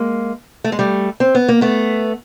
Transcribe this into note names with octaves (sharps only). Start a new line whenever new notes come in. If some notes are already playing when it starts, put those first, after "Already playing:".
Already playing: G#3 A#3
A3
G#3
G3 A3
C4
B3
A#3
A3 B3